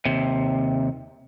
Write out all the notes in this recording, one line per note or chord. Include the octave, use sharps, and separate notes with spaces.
D#2 C3